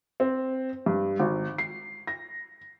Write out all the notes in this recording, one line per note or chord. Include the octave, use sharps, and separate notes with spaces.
C4
G2
G#1
C7
A#6